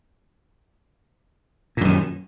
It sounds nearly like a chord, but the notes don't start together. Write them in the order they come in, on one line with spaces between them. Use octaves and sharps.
A#2 F#2 D#3